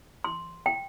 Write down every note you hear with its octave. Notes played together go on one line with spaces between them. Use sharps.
C6
G5